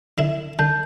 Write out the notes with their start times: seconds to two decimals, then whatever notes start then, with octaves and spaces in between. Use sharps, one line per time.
0.18 D3 E4
0.59 D3 A5 G6